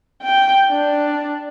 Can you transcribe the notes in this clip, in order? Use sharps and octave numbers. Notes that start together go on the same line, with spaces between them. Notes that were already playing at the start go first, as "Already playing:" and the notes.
G5
D4